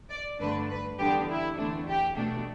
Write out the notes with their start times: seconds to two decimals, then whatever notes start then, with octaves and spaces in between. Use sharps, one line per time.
0.11 D5
0.39 G2 D3 A3 D4 B4
0.70 B4
0.99 E2 D3 G3 B3 D4 G4
1.29 E4
1.58 E2 D3 A3 D4
1.87 G4
2.17 B2 A3 D4